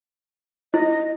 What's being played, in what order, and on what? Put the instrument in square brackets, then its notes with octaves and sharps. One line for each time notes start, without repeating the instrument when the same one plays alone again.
[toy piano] E4 [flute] D#5